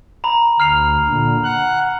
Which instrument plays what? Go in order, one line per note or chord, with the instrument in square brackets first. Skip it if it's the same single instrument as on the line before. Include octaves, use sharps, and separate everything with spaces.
[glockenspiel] A#5 B5
[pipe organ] D2 [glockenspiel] F6 C7 F7
[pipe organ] A#2 D3
F#5 F#6